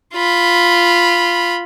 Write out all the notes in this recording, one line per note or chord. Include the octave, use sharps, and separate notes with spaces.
F4 B5